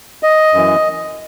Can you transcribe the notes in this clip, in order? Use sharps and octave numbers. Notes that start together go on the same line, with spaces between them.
D#5
F#2 E3